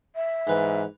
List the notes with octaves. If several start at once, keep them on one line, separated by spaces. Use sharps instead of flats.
E5
G#2 E3 B4